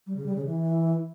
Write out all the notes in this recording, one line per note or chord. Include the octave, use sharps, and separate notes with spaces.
G3
C#3
G3
C#3
E3